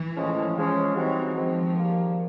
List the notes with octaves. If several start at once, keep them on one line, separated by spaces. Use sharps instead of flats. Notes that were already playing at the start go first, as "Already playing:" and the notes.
Already playing: E3
A2 F3 G#3 C#4
E3 F3 G#3 C#4
E3 G3 C4 D#4 F#4
D#3 F3 G#3 C4
D#3 G3 A#3